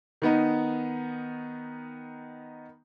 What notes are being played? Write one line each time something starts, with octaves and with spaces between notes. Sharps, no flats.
D#3 B3 D#4